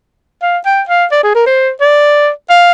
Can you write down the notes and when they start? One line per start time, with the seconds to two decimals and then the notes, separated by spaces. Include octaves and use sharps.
0.42 F5
0.65 G5
0.89 F5
1.12 D5
1.23 G#4
1.35 A#4
1.47 C5
1.81 D5
2.50 F5